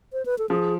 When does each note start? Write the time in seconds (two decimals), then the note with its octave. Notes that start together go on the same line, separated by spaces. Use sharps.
0.13 C5
0.26 B4
0.38 A4
0.49 F3 G#4